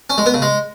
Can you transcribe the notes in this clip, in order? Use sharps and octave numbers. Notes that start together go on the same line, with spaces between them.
C#4
G#3
B3
C#3
G#3